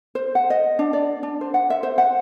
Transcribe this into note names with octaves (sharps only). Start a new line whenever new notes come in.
C5
F#5
D#5
D4
D5
D4
C5
F#5
E5
C5
F#5